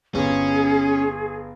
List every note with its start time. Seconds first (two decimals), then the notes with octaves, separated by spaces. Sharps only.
0.15 G1 C#4 G#4